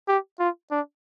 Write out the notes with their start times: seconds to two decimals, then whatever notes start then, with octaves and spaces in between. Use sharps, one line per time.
0.08 G4
0.39 F4
0.71 D4